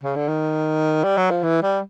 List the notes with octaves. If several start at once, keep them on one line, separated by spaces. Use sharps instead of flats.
C#3
D3
D#3
G3
F#3
F3
E3
G3